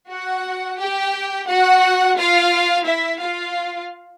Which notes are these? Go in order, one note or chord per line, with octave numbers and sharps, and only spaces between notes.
F#4 F#5
G4 G5
F#4 F#5
F4 F5
E4 E5
F4 F5